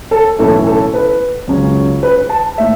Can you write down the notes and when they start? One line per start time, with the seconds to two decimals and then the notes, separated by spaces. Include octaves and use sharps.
0.11 A4
0.39 B1 A2 E3 C#4 E4 A4
0.67 A4
0.94 B4
1.47 C#2 C#3 F#3 C#4
2.03 B4
2.29 A5
2.58 A2 E5